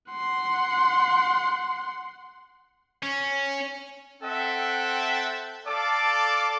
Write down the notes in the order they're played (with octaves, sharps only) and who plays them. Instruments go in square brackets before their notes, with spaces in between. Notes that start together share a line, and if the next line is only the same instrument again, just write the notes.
[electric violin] F#5 C6
[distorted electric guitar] C#4
[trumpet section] C4 A4 E5 F#5 G5
A4 D5 F5 A5 D6